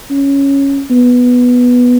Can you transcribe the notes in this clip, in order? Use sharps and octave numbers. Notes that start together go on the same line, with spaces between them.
C#4
B3